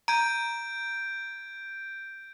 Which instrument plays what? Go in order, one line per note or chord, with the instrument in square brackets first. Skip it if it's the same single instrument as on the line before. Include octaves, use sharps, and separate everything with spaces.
[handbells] A#5 [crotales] G6 G#6 D7